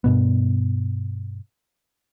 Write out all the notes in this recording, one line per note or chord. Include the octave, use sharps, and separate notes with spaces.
G2 B2 B3